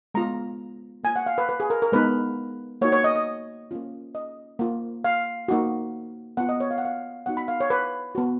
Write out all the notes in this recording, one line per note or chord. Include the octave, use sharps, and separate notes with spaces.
G#3 B3 F4 A#5
A#3 F4 G#5
F#5
F5
B4
B4
G#4
A#4
A#4
G#3 B3 D#4 B4
A#3 D#4 F#4 C#5
C#5
D#5
D#5
A#3 C#4 F4
D#5
A#3 F4
F5
A#3 D#4 F#4
B3 F4 F#5
D#5
C#5
F5
F#5
F5
B3 D#4 F#4 F#5
B5
F5
C#5
B4
B3 F#4